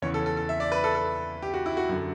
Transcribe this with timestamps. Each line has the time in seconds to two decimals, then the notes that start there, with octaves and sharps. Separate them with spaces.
0.02 E2 C#3 E3 C#5
0.14 A4
0.26 A4
0.37 A4
0.49 E5
0.60 D5
0.72 B4
0.84 A4
0.95 A4
1.42 G4
1.54 F#4
1.66 E4
1.77 F#4
1.89 F#2 D3